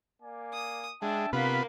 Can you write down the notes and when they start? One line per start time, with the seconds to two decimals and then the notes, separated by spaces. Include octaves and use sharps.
0.22 A#3 D5 G#5
0.53 D#6
1.02 G#3 D4 E5 G5 A5
1.33 C3 A#3 B3 F4 B4 F5 F#5 B5